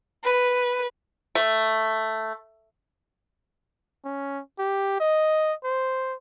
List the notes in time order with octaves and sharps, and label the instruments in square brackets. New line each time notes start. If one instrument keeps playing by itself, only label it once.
[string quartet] B4
[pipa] A3
[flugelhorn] C#4
G4
D#5
C5